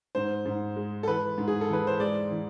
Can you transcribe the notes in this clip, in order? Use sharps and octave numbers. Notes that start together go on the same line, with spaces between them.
G#2 C5
G#2
G#3
A4
E3 B4
G#2
G#4
A4
E3 B4
C5
G#3 D5
E3